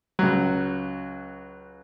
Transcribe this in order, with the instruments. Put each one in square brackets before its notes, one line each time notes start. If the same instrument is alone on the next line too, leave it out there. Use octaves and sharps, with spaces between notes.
[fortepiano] C#2 F#3